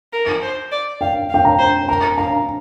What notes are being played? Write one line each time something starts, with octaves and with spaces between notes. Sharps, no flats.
A#4
C5
D5
F5 G5
F5
G5
A#5
C5
A#4 A#5
F5 A#5